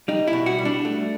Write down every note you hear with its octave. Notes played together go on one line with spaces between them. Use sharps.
G3 D#4
E4
B2
F#4
G3
D4
A3